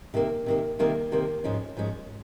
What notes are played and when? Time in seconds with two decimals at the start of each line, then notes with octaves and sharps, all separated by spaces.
0.14 C3 D#3 A#3
0.46 C3 D#3 A#3
0.79 C3 D#3 A#3
1.12 C3 D#3 A#3
1.44 G#2 F3 G#3 C#4
1.77 G#2 F3 G#3 C#4